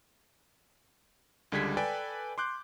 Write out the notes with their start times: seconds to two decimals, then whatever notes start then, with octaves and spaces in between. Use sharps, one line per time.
1.52 C#2 D3 G3 G#3 G#6 B6
1.77 A4 B4 D5 G5 G#5
2.38 C6 D6 F#6 G6